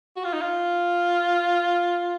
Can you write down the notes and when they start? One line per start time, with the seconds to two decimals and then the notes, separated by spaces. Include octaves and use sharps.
0.17 F#4
0.25 F4
0.33 D#4
0.42 F4